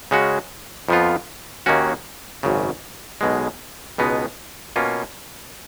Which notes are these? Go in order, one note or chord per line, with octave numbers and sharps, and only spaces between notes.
C#3 G#3 C#4 F#4
F2 F3 B3 F4
D#2 D#3 A#3 C#4 F#4
G#1 F#2 C#3
B1 B2 G#3
C#2 B2 G#3 B3 D#4
B2 A#3 C#4 F4